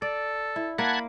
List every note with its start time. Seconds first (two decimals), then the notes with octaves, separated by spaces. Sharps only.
0.02 A4 D5
0.56 E4
0.78 A#3 F#5 A5 B5 G#6